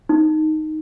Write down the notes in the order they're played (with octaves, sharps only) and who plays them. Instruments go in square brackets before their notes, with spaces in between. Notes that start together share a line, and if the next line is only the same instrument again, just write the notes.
[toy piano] D#4